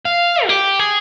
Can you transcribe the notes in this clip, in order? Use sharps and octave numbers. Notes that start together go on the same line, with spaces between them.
F5
F4
G4
G#4